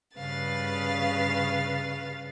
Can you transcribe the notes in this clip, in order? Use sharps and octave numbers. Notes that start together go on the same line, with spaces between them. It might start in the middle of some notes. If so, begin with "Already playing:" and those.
G2 C#3 B4 F5 A6